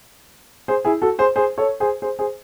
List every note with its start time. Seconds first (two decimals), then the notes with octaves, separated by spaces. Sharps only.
0.68 G#4 C5
0.85 E4 G#4
1.02 F#4 A4
1.19 G#4 C5
1.36 G#4 C5
1.58 A4 C#5
1.80 G#4 C5
2.02 G#4 C5
2.19 G#4 C5